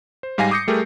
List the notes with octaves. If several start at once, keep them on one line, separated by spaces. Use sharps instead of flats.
C5
G#2 G3 F5 G#5 A#6 C7
D6 D#6 G6 A#6 C#7
G3 A3 G4 G#4 A#4